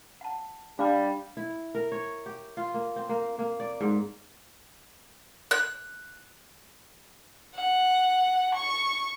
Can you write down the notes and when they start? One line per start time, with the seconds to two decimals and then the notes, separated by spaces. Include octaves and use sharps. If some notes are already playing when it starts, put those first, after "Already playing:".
0.21 F#5 A5
0.79 G3 D4 F5 D6
1.37 E4
1.75 A#4
1.92 C#5
2.26 G4
2.57 F4
2.74 A#3
2.96 C4
3.09 A#3
3.39 A#3
3.60 D5
3.81 G#2
5.51 F#6
7.55 F#5
8.55 C#6